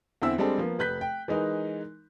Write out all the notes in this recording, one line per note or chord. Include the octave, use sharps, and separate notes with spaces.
E2 D3 C4 E4 E6
G3 G#3 C4 D4 A4
F3 A#3 B3
F1 B4 F#6 G6 B6
G5
E3 G#3 D#4 A#4